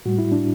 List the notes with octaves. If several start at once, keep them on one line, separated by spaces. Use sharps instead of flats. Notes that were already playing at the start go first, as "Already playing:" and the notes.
A2 G3 F#4
E4
D4